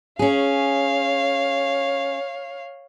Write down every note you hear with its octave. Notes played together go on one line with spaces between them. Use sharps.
C#4 G#4 C#5 F5